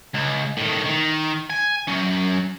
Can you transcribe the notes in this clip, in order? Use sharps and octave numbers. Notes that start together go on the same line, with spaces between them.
C#2
A2 D#3
D#3
G#5
F#3 C#4